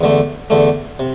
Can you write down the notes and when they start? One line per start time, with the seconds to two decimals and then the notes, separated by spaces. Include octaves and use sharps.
0.01 E2 D3 A3
0.50 E2 D3 A3
0.99 C3